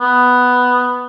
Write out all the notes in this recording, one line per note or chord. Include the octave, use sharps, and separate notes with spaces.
B3